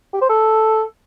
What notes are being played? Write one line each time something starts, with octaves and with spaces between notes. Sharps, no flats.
G4
C5
A4